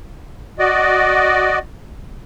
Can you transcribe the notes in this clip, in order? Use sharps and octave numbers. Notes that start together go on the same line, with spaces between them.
F#4 D5 D#5